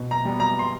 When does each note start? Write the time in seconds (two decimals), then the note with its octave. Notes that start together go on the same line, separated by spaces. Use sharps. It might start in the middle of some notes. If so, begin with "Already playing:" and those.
Already playing: B2 B3
0.11 A#5
0.25 G3 B3
0.40 A#5
0.59 C6